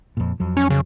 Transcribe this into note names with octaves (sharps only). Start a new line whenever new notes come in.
F2 A#2
F2 F#3
C#4
C#3